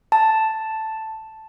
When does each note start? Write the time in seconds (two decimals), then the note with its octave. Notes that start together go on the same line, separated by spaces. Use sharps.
0.12 A5